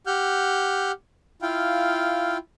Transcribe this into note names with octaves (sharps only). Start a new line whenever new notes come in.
G4 F#5 F6 G6
E4 F4 F5 G5